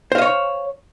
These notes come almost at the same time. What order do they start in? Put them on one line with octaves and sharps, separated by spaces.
C5 F5 D#5 C#5